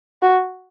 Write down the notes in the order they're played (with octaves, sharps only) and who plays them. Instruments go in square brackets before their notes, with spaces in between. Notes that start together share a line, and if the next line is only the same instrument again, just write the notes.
[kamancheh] F#4